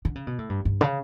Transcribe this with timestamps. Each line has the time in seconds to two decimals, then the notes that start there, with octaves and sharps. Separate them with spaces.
0.05 D3
0.15 C#3
0.27 B2
0.39 A2
0.49 G2
0.65 G2
0.81 C#3